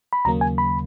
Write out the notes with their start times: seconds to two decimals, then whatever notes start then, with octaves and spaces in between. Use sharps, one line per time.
0.13 B5
0.25 D#2 C#3 F#3 A#3 A#5
0.41 G#5
0.58 B5